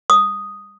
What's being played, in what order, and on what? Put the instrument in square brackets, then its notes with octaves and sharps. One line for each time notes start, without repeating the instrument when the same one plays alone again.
[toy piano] D#6